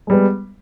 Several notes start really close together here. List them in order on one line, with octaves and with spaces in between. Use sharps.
G#3 G3 B3